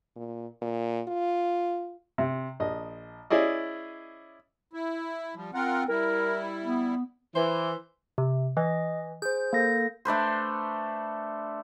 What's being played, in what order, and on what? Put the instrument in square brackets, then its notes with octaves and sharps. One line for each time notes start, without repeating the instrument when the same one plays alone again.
[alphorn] A#2
A#2
F4
[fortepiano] C3
A#1 D#5
C#4 E4 G#4 D5 D#5
[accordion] E4
F3 G3
[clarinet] C4 [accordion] F4 A#4 F#5
[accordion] G3 E4 [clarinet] A#4
[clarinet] B3
[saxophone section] E3 [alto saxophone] C5
[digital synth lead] C3
[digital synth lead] E3 [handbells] D#5
[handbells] G#4 C5 [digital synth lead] G6
[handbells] A#3 A4 A#6
[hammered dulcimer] A3 D4 B4 C5